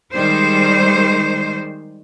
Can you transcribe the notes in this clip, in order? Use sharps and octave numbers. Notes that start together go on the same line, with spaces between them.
D#3 G3 G#3 C5